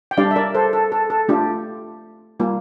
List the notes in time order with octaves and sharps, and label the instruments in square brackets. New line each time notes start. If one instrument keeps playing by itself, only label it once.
[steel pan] G5
G3 D4 G4 D5 F5
E5
A#4 D5
A4 C5
A4
A4
A4
A3 D4 F4 G4
G3 A#3 F4